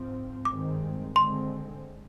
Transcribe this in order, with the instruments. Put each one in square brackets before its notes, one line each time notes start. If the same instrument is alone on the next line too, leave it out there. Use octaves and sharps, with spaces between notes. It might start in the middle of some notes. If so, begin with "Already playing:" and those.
Already playing: [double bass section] G#2 F3 C4
[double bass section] G2 D#3 G#3 C4 [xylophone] D6
[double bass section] D3 G#3 C4 [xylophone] C6